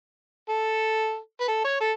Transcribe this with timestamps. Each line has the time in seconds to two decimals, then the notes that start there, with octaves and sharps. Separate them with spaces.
0.49 A4
1.41 B4
1.48 A4
1.64 C#5
1.80 A4